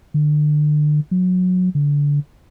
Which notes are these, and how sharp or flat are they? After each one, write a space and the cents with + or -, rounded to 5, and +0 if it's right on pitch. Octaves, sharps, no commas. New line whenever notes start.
D3 +30
F#3 -20
D3 -25